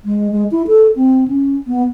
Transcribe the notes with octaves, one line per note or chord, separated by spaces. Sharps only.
G#3
G#3
E4
A4
C4
C#4
B3